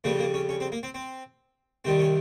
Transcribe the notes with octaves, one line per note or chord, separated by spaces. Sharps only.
F2 C#3 G3 A#3
A#3
C#4
C#4
C4
A#3
C4
C4
C2 C3 D#3 G3 C4
C#4